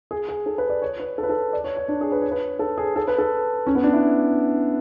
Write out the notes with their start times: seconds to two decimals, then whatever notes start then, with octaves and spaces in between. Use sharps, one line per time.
0.11 G#4
0.29 G#4
0.46 A4
0.58 B4
0.69 D5
0.82 C#5
1.00 B4
1.18 A4
1.23 B4
1.29 A4
1.53 D5
1.64 C#5
1.77 C#5
1.88 D4
2.01 G#4
2.12 B4
2.21 C#5
2.32 B4
2.59 A4
2.78 G#4
2.96 A4
3.08 B4
3.18 A4
3.67 C#4
3.75 B3
3.84 D4
3.93 E4